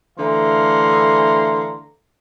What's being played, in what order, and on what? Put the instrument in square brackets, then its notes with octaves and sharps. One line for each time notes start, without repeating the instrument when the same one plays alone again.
[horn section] D3 E3 A3 F5 A#5 C6